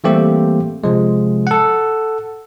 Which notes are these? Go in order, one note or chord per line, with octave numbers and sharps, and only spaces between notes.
E3 G3 A3 A#3 C4 G4
C3 F3 G#3
A4 F#5